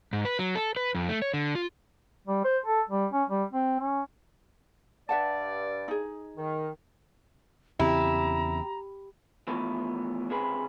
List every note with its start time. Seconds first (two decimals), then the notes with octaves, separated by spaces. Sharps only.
0.13 G#2
0.25 B4
0.39 F#3
0.55 A4
0.76 B4
0.95 F2
1.09 A3
1.22 C#5
1.34 D3
1.55 F4
2.27 G3
2.44 C5
2.66 A4
2.90 G3
3.13 C#4
3.29 G3
3.53 C4
3.80 C#4
5.09 G2 D5 E5 F#5 A5
5.88 D#4 G#4
6.36 D#3
7.79 E2 C#3 C4 E4 G4 A#5
9.47 E3 F3 A3 B3
10.29 C#2 C3 G#4 B4